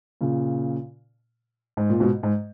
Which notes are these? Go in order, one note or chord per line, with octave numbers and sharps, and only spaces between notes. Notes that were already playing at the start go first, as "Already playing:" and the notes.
A#2 C#3
G#2
A#2
G#2 B2
G#2